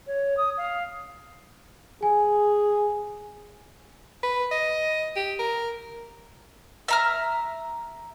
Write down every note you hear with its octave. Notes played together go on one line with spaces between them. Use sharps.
C#5
D#6
F5
G#4 G#5
B4
D#5
G4
A#4
E5 A#5 F6